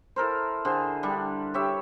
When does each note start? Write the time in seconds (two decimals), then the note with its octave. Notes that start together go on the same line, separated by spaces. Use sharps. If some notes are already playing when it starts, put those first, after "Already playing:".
0.16 E4 A4 A#4 C5
0.65 D3 G#4 C5
1.03 G3 D4
1.54 G4 C#5 E5